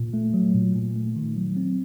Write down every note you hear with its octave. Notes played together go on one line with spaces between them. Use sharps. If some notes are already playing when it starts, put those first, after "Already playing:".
Already playing: A#2
A3
F#3
A#2
A#2
A3
D#3
F#3
C4